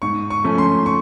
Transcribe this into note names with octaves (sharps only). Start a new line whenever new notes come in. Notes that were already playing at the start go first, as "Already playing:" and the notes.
G#2 C#6
C#6
F3 A3 C#4
C6
C#6